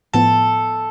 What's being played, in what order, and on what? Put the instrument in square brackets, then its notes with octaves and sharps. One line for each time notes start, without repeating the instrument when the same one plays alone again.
[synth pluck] A2 F3 B3 [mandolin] A4